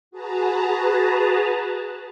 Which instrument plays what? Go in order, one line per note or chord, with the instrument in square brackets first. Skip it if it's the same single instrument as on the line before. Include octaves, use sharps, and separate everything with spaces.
[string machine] F#4 G#4 B4 A5 A#5